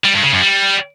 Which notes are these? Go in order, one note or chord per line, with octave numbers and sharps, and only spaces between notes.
G3
G2
C#3
F#2
G3